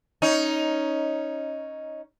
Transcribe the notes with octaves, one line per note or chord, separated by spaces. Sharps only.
C#4 D#4